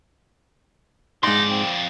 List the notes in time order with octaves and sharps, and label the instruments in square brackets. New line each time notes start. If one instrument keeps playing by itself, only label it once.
[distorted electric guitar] F2 D5 [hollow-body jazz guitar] G#2 C6 [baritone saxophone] D#4
[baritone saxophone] C4